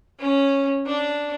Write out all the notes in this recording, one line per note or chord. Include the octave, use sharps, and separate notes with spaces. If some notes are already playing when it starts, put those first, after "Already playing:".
C#4
D4